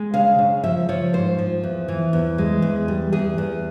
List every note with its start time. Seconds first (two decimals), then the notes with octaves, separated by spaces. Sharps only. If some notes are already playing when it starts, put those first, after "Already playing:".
Already playing: G#3
0.14 C#3 F5
0.39 C#3
0.64 F3 E5
0.89 F3 C#5
1.13 G#2 C5
1.38 F3
1.63 E2
1.88 E3
2.13 E2
2.38 G#3
2.62 E2
2.88 G3
3.13 E2 G#4
3.38 E2